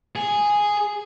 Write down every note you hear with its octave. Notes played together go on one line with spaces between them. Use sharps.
G#4